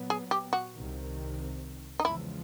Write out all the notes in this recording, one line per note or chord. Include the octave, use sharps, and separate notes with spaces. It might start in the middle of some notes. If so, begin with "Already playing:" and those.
Already playing: A#2 F#3 B3
G#4
G4
F#4
C2 C3 D#3
D#4
E2 C#3 F3 G#3 E4